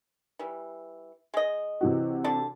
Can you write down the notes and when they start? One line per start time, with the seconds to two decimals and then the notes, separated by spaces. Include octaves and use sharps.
0.39 E3 G3
1.34 G#3 D#5
1.81 C3 E3 F#4
2.24 D3 D5 A5